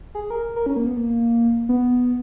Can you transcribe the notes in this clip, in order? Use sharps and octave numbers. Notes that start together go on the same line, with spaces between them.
G#4
A#4
A#4
C#4
A#3
B3
A#3
B3